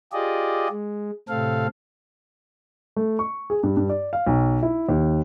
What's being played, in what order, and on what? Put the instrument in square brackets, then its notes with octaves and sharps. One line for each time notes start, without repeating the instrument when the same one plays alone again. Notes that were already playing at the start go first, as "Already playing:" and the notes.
[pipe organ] F4 G4 G#4 D5 D#5
G#3
A2 C3 C4 A4 F5
[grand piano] A3
C#6
G#4
G2
G2
D5
F5
B1
E4
D#2